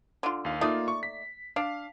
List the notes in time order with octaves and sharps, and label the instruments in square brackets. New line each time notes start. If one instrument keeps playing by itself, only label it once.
[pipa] D3 F4
[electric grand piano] D#2 F5
[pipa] A3 D#4 D5 [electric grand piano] A#3 F4
[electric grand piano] C#6
B6
[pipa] D4 [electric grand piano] F5